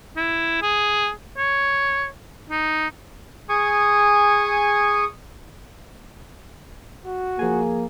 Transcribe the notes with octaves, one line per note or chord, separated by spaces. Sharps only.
E4
G#4
C#5
D#4
G#4 G#5 C#6 D#6
F#4
F3 A#3 G#4 G#5